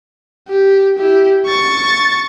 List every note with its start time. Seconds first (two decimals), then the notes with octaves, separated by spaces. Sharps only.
0.48 G4
0.98 E4 G4
1.47 C#6 A6